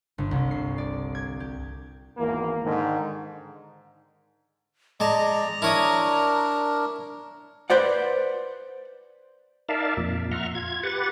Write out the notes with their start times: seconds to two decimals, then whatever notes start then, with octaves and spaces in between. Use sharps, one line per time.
0.18 G1
0.31 C2
0.51 C7
0.78 D5
1.15 G#6
1.40 G4
2.17 G#1 E2 A#3
2.64 G#2 D3 D#3
5.00 G#3 D5 A5 A#5
5.62 D4 E4 A#4 C#5 D#6
7.70 B4 C5 D5 F#5
9.69 D#4 A#4 D5 E5 F5 A5
9.97 F2 A#2
10.31 E5 F#5 A#5 C6 C#6 F6
10.55 F4 G#6
10.83 G4 B4 F#5 A6